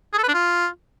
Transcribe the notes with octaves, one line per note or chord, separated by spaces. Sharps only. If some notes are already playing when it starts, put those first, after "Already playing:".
G#4
A4
B4
D4
F4